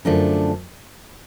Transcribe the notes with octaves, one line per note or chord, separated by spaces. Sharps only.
F#2 D3 F3 A3 D4